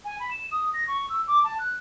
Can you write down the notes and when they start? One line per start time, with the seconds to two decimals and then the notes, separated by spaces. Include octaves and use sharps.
0.04 G#5
0.19 B5
0.31 E7
0.51 D#6
0.73 A#6
0.87 C#6
1.09 E6
1.27 D6
1.44 A5
1.58 F#6